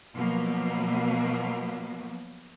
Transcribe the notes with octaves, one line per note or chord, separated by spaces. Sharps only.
B2 F3 F#3 A#3